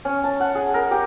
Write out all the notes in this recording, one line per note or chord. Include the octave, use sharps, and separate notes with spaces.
C#4
A5
F#5
G#4
A#4
G4